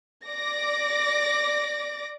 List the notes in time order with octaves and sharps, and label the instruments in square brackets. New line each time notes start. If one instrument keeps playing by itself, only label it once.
[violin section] D5 D6 A#6